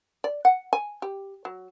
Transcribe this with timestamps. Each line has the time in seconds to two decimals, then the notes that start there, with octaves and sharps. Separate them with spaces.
0.24 D5
0.45 F#5
0.73 G#5
1.02 G4
1.45 F#3